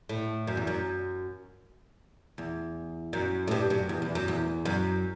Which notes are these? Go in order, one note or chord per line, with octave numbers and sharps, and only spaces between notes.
A2
F#2
E2
F#2
E2
F#2
A2
G2
F#2
E2
E2
F#2
E2
F#2